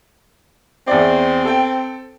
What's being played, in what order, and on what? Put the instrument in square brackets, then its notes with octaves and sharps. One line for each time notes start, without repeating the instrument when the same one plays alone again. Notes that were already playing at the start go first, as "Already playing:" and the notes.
[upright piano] E2 D5 [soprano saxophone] C4
[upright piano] A4 G5